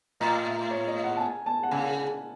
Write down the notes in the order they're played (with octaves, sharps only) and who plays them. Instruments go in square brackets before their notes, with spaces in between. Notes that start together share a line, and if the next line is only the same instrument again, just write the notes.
[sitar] A2 [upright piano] D#5
[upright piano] E5
C#5
D#5
F#5
A5
G#5
A5
F#5
[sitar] C#3 [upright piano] G#5